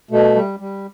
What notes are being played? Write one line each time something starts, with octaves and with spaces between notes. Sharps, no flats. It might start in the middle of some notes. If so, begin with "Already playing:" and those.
B2 A3
G3
G3